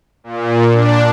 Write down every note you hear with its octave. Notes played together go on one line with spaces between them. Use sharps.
A#2
D4